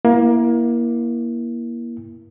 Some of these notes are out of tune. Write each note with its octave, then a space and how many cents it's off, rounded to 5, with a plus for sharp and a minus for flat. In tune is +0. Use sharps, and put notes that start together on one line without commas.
A#3 +25 E4 +0